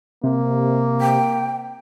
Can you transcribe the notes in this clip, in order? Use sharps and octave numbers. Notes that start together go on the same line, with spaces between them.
C3 A#3
G5